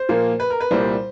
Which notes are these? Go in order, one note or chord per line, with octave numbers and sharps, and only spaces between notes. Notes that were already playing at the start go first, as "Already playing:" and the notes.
Already playing: C5
A#2 F3 A#3
B4
A#4
B4
C2 A#2 G3 C5